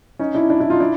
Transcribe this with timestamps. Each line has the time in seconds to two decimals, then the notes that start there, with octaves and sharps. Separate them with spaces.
0.19 C#4 D#4
0.35 D4 E4
0.50 D4 E4
0.60 D4 E4
0.70 D#4 F4
0.80 D4 E4